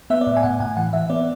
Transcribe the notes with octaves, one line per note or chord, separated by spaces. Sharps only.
B3 E5
D5
A2
G#5
A2 F#5
A2 G#5
E3 F#5
E3 E5
B3 D5